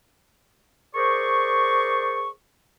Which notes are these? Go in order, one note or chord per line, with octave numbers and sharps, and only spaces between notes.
G#4 A#4 C5 D5 C#6